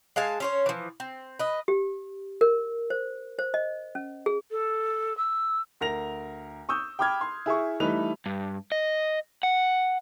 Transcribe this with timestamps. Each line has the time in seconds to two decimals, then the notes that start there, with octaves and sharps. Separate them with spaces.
0.16 G#3 F5 G#5 A5
0.40 C#4 C5 C#5
0.66 E3 F3
1.00 C4
1.39 B4 D#5
1.68 G4
2.41 A#4
2.90 C5
3.39 C5
3.54 D#5
3.95 C#4
4.26 G#4
4.51 A4
5.17 E6
5.81 D2 A#4 A#6 F7
6.69 C#6 D#6 E6 G6
6.99 G5 B5 D6 F6 G#6
7.21 C6
7.46 E4 G#4 E5 C#6
7.80 E3 G3 A3 D#4 B4 F7
8.26 G2
8.72 D#5
9.43 F#5